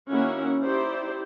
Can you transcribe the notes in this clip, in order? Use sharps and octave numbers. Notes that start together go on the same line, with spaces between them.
D#3 A#3 C#4 E4 F#4 F#5
D#4 E4 G4 C5 D5